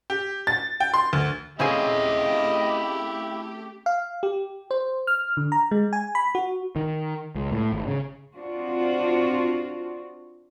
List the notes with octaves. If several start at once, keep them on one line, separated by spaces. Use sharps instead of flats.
G4
A6
G5
C6
D2
A3 C4 C#4 E4 G4 G#4 D#5 F5
F5
G4
C5
F6
D3
A#5
G#3
G#5
B5
F#4
D#3
C#2
A2
G#1
C#3
C4 D4 F4 F#4